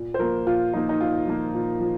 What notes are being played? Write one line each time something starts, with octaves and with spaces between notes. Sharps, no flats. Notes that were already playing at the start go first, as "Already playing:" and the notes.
Already playing: A#2
C5
F3 A#3 A#4
A#2 F4
F3 A#3 D#4
D#4
A#2 F4
F3 A#3
A#2
F3